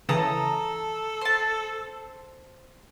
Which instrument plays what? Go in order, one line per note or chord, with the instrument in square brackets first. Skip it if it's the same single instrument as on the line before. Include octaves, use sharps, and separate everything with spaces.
[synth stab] C#3 E3 [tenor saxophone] A4 [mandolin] A5 A#5 D#6
[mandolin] C5 A5